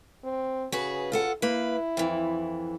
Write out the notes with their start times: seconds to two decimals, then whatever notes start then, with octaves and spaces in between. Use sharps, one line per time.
0.24 C4
0.72 C#3 F#4 G#4 B4
1.12 F4 A4 F#5
1.42 A#3 E4 B4
1.97 F2 E3